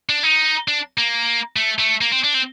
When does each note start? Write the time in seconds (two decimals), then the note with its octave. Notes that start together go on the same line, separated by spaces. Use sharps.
0.09 D4
0.23 D#4
0.68 D4
0.98 A#3
1.56 A3
1.79 A3
2.01 A#3
2.12 C4
2.24 D4
2.34 C4